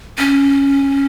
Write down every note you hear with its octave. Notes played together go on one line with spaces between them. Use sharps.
C#4